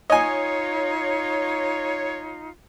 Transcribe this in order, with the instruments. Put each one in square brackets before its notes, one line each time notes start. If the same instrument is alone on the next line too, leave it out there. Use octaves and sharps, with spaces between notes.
[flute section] D#4 F4 [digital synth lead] C#5 [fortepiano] D#5 G#5